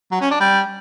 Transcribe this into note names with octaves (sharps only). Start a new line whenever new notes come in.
F#3
C#4
D4
G3